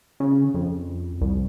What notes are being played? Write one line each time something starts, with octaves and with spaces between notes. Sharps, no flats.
C#3
F2
C2